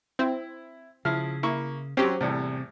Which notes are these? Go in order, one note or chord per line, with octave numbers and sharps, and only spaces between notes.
C4 E4
C#3 F3 E4 F6
A#3 E4 C#6
F#3 C4 C#4 G4
E2 A2 C3 G3